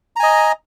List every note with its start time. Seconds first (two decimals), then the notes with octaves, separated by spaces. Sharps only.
0.16 A#5
0.20 G#5
0.23 D#5